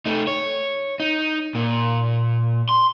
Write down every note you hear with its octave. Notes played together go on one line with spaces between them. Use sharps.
A3 D#4
C#5
D#4
A#2
C6